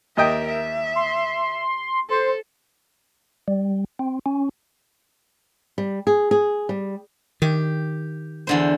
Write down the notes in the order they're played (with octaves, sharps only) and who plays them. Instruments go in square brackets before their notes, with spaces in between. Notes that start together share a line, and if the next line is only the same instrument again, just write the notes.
[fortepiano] D#2 D#5 G5 [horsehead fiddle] A#4 E5
[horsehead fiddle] E5
[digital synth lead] C6
[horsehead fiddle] A4 [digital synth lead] C5
[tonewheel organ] G3
C4
C#4
[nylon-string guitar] G3
G#4
G#4
G3
[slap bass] D#3 [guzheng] G4
[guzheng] E2 D3 C5